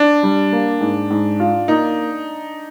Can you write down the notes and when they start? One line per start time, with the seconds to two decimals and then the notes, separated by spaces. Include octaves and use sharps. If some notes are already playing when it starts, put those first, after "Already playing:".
Already playing: D4
0.23 G3
0.52 A#3
0.81 G#2
1.10 G#2
1.40 F4
1.68 A#3 D#4